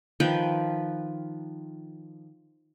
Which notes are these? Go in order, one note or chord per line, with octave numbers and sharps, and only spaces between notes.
D#3 F3 B4 G5